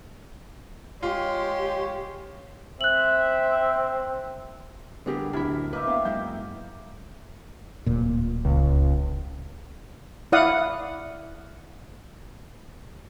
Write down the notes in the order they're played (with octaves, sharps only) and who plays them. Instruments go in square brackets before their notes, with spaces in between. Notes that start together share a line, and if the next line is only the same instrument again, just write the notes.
[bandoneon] G#3 C6 [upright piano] F4 [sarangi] G4 [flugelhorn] C#5
[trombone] C4 [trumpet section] E5 [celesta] F#6 F#7
[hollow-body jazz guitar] D3 G#4 A#4 [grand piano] G3 B3 G4
[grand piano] D1 E4 [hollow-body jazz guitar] D4 B5 [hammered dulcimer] A#4
[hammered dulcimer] A#3 D#4 E5 [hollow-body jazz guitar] B4
[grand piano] B3 F5 [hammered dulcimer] G5
[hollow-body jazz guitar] F#2 G#3 E4 [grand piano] G6
[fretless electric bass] D1 A#2
[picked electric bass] C#2
[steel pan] E4 D5 F5 F#5 D#6